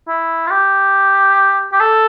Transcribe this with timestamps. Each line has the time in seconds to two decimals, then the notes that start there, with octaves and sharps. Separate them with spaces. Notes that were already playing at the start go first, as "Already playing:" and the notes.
0.08 E4
0.47 F4
0.51 G4
1.73 G4
1.80 A4